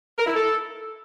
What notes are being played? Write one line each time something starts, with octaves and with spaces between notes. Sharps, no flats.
A#4
E4
A4